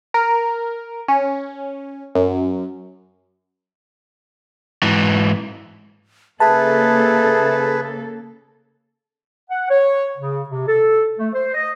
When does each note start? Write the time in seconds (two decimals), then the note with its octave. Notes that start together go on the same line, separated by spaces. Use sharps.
0.14 A#4
1.08 C#4
2.15 F#2
4.83 G#2 E3
6.40 C#3 A#3 G#4 A4 B4 E5 A5
9.50 F#5
9.69 C#5
10.17 C#3
10.49 C3
10.67 A4
11.19 A3
11.33 C5
11.54 D#5